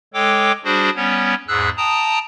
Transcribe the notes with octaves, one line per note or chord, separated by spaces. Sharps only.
G#3 A4 C#5 G5 D6
G3 D4 F#4 G#4 C5
G3 B3 C#4 C#5
E2 G#2 G#4 E6 F#6
G5 A5 A#5 D#6